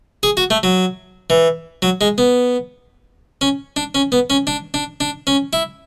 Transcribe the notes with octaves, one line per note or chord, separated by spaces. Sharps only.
G#4
F#4
A3
F#3
E3
F#3
G#3
B3
C#4
D4
C#4
B3
C#4
D4
D4
D4
C#4
E4